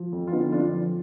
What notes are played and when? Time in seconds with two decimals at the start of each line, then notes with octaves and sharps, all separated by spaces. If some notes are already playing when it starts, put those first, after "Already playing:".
Already playing: F3
0.12 F2
0.27 F4
0.32 D3 B3 D#4
0.52 F2 D4 F4
0.73 F3